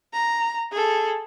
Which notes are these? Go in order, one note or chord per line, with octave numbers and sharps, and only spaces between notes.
A#5
G#4 A4